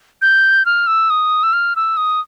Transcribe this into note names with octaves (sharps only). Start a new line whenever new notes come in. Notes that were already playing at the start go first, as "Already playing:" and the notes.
G6
F6
E6
D#6
E6
F6
E6
D#6